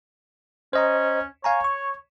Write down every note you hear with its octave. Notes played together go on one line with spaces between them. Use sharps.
C#4 C5 D#5 A#5
C#5 F5 G#5 A#5
C#6